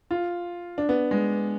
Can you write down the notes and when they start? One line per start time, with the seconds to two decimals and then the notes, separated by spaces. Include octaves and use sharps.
0.11 F4
0.78 D4
0.89 B3
1.11 G#3